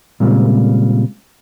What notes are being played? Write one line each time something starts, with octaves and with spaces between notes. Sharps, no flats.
A#2 C#3 G3 G#3 C4 F4